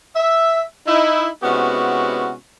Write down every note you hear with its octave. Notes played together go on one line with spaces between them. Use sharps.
E5
D#4 E4
C3 G#3 B3 C#4 E4 F#4